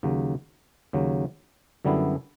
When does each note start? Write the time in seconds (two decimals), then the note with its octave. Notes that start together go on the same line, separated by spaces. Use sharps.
0.03 D#2 C#3 F#3
0.93 D#2 C#3 F#3
1.85 F#2 D3 G3 B3 E4